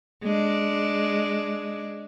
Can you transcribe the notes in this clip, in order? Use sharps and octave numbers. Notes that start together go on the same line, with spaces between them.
G#3 D4